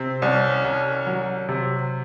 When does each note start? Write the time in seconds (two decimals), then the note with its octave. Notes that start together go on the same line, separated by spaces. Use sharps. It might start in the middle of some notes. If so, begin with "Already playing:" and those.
Already playing: C3 C4
0.22 C2 C#4
0.65 C2
1.06 F#3
1.49 C3